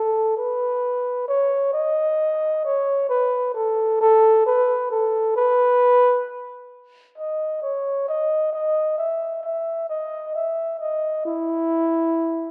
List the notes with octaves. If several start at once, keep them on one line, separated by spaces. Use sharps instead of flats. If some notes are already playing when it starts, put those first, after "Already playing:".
Already playing: A4
B4
C#5
D#5
C#5
B4
A4
A4
B4
A4
B4
D#5
C#5
D#5
D#5
E5
E5
D#5
E5
D#5
E4